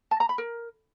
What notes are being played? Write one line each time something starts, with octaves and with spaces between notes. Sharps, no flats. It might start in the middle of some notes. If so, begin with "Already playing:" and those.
A5
A#5
B5
A#4